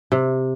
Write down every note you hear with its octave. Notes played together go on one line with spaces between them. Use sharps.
C3